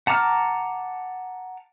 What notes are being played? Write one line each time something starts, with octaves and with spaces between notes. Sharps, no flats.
F#5 A5 A#5 D6 F6